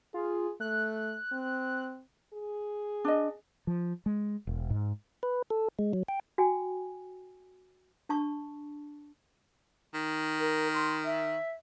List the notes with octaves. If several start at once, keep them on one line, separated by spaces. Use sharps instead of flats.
F4 G#4
A3 F#6
C4
G#4
D4 D#5
F3
G#3
E1
G#2
B4
A4
G#3
F#3
G5
F#4 G5 G#5
D4 A5 C#6
D#3
A#4
C6
E5